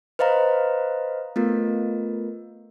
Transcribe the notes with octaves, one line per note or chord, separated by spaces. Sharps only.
B4 C5 D#5 F5 A#5
A3 B3 F4 A#4